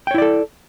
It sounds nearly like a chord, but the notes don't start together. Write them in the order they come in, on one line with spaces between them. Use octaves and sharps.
G5 C#5 E4 D5 A4